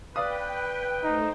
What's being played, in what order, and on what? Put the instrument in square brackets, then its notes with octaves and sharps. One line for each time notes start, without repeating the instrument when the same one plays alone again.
[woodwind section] B4 [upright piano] D5 F5 D#6 [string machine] G5
[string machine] A3 C5 [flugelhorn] D#4